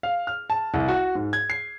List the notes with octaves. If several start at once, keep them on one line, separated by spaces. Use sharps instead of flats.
F5
F6
A5
C2
F#4
G#2
G#6
C7